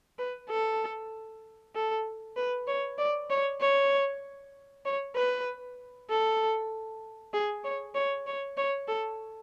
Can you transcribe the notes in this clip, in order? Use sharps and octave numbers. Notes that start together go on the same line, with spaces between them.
B4
A4
A4
B4
C#5
D5
C#5
C#5
C#5
B4
A4
G#4
C#5
C#5
C#5
C#5
A4